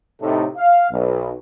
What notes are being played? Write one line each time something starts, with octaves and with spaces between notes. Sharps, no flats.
A2 C3 D#4 A4
F5
B1